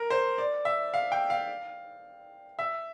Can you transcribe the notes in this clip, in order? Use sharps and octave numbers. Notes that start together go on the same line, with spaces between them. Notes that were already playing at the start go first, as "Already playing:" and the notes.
Already playing: A#4
C5
D5
E5
F5
G5
F5
E5